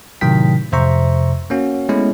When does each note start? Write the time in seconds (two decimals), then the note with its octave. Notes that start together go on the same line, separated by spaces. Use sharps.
0.21 A2 C3 D#3 F#3 G5 B6
0.72 F2 C3 C5 E5 A#5 C#6
1.50 A#3 C#4 F#4
1.89 G#3 A3 B3 C#4 E4